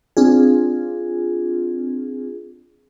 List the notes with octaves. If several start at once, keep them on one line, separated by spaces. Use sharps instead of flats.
C4 D4 F4 G#4